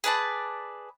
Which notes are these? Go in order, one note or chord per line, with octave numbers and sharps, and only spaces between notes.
G#4 B4 D5 A5